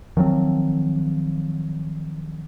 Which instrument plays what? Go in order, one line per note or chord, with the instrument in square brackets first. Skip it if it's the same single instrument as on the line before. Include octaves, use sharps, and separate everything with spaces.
[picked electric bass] D#3 F3 F#3 C4